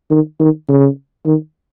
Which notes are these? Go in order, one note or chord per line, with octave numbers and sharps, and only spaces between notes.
D#3
D#3
C#3
D#3